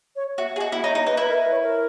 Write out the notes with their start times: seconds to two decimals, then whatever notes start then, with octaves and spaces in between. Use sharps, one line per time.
0.16 C#5
0.38 F#4 E5
0.56 G#4
0.61 F#4 D#5
0.72 E4
0.83 D#4 C#5
0.95 D#4
1.06 D#4 B4
1.17 E4 B4
1.29 A#4
1.40 B4
1.51 C#5
1.62 A#4